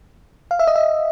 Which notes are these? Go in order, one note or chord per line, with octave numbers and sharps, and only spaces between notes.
F5
E5
D#5
E5